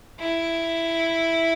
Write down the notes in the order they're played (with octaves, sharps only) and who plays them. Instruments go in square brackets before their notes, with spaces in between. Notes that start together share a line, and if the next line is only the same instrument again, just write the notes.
[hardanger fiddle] E4